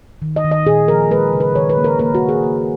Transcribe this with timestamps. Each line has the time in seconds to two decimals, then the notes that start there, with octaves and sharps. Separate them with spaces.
0.22 D#3
0.36 D#5
0.44 D#3
0.51 D#5
0.66 A#2 G#4
0.88 F3 A#4
1.11 G#3 B4
1.33 C#3
1.40 B4
1.55 D#3 C#5
1.69 B4
1.77 A#3
1.84 A#4
1.99 A#3 A#4
2.15 F#4
2.22 C#3
2.29 G#4
2.44 A#3